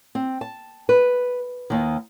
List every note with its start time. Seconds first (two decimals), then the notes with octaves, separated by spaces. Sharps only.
0.15 C4
0.41 A5
0.89 B4
1.70 D#2 D#3